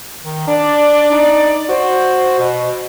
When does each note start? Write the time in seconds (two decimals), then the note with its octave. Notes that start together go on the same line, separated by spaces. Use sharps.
0.24 D#3
0.47 D4 D5
1.12 D#4
1.69 F#4 C5
2.39 B2